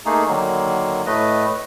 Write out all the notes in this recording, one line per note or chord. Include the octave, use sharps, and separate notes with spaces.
A3 A#3 D#4 G#4
D3 D#3 F#3 A#3
A2 A3 B4 D#5